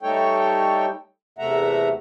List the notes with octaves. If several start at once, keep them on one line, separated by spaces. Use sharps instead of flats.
G3 A3 D#4 A4 C#5 G5
E2 C3 A3 E5 F#5 A#5